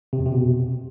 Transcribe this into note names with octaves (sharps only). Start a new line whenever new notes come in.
C3
F2
C3
B2